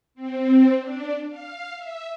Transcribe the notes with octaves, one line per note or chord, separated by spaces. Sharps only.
C4
D4
F5
E5